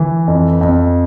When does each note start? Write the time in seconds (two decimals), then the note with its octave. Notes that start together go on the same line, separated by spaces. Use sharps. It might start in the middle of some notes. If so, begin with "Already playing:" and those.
Already playing: E3
0.28 F2
0.61 F2